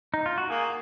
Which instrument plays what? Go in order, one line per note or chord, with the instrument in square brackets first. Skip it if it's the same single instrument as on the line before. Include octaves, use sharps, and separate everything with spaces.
[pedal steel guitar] D#4
F4
F#4
[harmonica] A#3 [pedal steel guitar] G#4